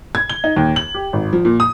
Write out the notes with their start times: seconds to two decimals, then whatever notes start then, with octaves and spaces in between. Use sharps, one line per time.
0.15 G#6
0.30 G7
0.44 D#4
0.56 D#2
0.76 F#7
0.94 G4
1.13 G#1
1.33 F3
1.45 A#2
1.60 D#6